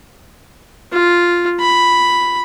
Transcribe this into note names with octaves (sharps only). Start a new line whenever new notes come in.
F4
B5